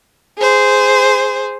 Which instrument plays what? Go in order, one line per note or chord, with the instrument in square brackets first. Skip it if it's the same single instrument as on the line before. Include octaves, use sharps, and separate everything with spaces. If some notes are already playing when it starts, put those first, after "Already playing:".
[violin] G#4 C5